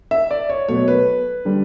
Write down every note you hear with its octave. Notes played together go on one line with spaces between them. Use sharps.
E5
D5
C#5
B2 F#3 A3 C#5
B4
D3 G3